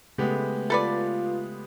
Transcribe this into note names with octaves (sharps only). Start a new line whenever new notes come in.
C#3 G#3 A3 B3 G4
F4 A4 B4 D5